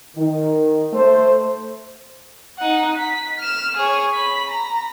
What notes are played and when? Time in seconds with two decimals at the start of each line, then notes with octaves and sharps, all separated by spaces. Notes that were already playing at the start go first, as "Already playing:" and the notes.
0.16 D#3
0.93 A3 C5
2.58 D#4 F#5
2.97 B6
3.39 F6 E7
3.77 G#4 C#5
4.14 B5 B6
4.49 A#5